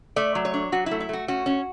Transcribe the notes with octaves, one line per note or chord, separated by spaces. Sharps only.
A3 D5
F#3
C#5
D4
F#3 F#4
E4
A3
E4
A3 F#4
C#4 F#4
C#4